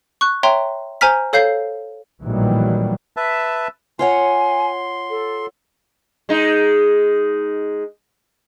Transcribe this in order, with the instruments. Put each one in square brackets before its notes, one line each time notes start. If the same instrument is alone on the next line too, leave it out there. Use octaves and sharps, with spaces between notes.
[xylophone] C#6 F#6
C#5 E5 G5 A#5 C6
C5 G#5 A#5 F6 B6
A4 C#5 F5 G6 C7
[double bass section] A#1 A2 D#3 E3 F#3 G3
[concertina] B4 E5 A5
[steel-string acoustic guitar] F4 C#5 F#5 [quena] G#5 [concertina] C6
[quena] A4
[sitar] G#3 D#4